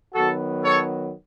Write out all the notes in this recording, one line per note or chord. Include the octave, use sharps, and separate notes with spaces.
D#3 F#3 B3 F#4 A4
A4 C#5